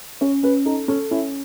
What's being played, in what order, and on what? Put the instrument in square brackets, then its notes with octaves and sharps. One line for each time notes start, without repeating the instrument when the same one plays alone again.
[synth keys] C#4 [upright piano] C#5
[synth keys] C#4 [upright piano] B4
[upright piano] D#4 [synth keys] A4
[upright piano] C#4 [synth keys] A4
[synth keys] C#4 [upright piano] E4